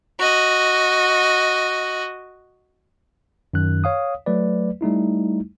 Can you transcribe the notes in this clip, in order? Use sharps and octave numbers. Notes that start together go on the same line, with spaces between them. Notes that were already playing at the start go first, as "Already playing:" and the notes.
F#4 D#5
F#2 D#3 F#6
C#5 F5 D#6
F#3 A3 B4 D5
G3 A3 D#4 E4